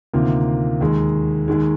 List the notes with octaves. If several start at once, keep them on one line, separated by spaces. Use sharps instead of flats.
D2 C3 D#3 A#3 F4
D#2 D#3 G#3
D#2 D#3 G#3